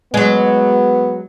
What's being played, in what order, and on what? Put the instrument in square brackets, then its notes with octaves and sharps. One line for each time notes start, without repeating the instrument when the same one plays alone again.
[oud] F#3 G#3 [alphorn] B3